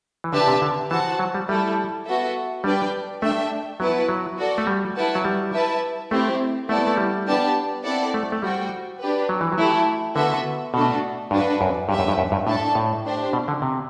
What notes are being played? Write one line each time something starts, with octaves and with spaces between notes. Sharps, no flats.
E3
D3 D4 G4 B4 E5 A5
C3
D3
E3 F#4 C5 F#5 A5
F#3
G3
G3 A3 E4 A4
B3 F#4 A4 E5
G3 D4 G4 B4 D5 G5
A3 D4 A4 E5 G5
F#3 B3 E4 B4 F#5 A5
F#3
F#4 A4 D5
A3
G3
E4 B4 F#5 A5
F#3
G3
E4 B4 E5 A5
A3 C4 E4 G4 C5
A3 B3 E4 A4 D5 A5
A3
G3
B3 D4 G4 D5 A5
C4 E4 A4 D5 F#5
A3
A3
G3 F#4 C5 G5
D4 G4 B4
F#3
E3
F#3
A3 E4 G4
D3 B3 F#4 A4 E5
B2 A3 D4 F#4 A4
G2 D4 F#4 B4
F#2
G2 G4 B4 E5
F#2
G2
F#2
G2
A2 D4 A4 E5 A5
A2
D4 G4 C5
B2
D3
C3